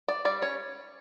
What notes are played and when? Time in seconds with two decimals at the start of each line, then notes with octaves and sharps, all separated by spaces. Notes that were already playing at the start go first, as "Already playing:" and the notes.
0.08 D4 D5
0.25 G3 D5
0.42 C#4 C#5